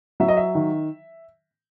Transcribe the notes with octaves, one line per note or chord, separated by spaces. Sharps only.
F#3 E5
D#5
E5
D#3